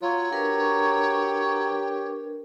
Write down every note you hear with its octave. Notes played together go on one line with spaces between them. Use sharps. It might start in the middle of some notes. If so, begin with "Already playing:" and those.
F#3 F4 C#5
D4 G4 A#4 B4